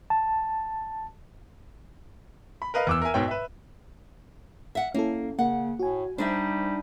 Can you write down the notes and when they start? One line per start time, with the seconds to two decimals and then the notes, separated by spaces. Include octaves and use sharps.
0.10 A5
2.62 B5
2.74 A#4 B4 D#5 F5
2.87 E2 D6 E6
3.02 A#4 E5 G#5
3.14 G#2 B2 C#5 G5
3.28 B4 E5
4.75 E5 F#5
4.94 A#3 C#4 E4 A4
5.39 C#3 A#3 F#5
5.79 A2 F#4 G#5
6.18 G3 D4 D#4 C5 E5